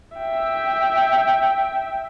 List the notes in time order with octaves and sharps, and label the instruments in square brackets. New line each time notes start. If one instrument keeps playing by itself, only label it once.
[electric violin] E5 G5